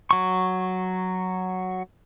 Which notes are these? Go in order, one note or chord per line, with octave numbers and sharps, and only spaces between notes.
F#3 C#6